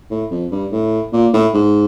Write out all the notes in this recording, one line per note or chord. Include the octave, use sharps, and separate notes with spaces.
A2
F2
G2
A2
A#2
A2
G#2